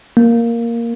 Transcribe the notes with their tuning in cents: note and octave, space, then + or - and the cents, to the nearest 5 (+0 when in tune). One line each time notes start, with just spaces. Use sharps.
A#3 +0